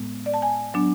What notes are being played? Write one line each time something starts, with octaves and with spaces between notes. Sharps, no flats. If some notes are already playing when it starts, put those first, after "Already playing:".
Already playing: A2 G#3 B3
D5
A5
G#5
F#3 B3 D4